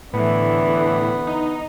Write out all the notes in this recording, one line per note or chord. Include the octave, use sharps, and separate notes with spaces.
A2 D3 E3 B3
D#4